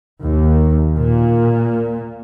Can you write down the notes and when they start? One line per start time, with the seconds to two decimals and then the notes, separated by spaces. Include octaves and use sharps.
0.21 D#2
0.95 A#2